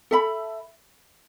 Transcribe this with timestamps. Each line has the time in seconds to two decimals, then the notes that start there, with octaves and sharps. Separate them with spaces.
0.11 A4 E5 B5